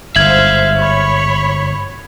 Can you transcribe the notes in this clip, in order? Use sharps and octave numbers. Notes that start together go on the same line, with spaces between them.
G1 G#2 C5 E5 F5 G#6 F#7
C#5 B5